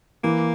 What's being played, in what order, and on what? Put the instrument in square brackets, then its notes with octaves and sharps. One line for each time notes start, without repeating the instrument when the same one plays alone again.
[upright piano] E3 [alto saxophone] A#3